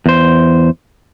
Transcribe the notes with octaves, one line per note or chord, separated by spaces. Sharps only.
E2 C5